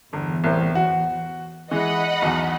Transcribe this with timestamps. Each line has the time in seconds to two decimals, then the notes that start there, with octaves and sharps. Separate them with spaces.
0.13 G1 E2
0.44 C2 A2 C5
0.75 F#4
1.71 E3 G#3 D#5 F#5 B5
2.22 B1 E2